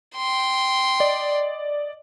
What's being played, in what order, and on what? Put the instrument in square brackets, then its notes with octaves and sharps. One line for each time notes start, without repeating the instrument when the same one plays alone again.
[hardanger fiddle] G5 C6
[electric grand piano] D5 D#5